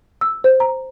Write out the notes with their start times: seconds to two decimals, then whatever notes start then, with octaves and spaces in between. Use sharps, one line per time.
0.21 E6
0.44 C5
0.60 A#5